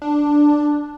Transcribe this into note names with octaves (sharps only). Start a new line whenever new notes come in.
D4